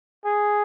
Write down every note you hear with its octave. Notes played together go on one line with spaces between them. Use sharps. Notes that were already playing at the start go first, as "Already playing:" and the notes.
G#4